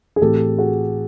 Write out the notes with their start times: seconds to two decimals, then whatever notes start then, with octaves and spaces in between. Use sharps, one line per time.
0.16 G#4
0.22 A2 E3 A3 C4 E4 G4 A4
0.58 F#4 G#4